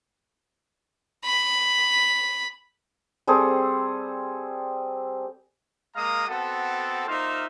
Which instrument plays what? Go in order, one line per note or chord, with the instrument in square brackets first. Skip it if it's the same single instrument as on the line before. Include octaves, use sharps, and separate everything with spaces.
[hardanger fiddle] B5
[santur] G3 C4 G#4 A4
[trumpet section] G#3 A#3 F5 A#5 D#6
B3 C4 F#4 A4
A#3 D#4 F4 C5 E5 F5